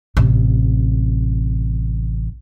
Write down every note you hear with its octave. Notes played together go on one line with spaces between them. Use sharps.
A1 C3